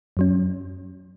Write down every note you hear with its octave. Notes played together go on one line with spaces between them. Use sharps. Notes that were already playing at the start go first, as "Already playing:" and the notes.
F#2 F#3 C#4